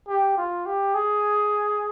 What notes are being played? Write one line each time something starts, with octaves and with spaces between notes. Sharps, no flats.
G4
F4
G4
G#4